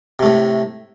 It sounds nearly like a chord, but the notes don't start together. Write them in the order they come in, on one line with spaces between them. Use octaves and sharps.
C3 A3 A2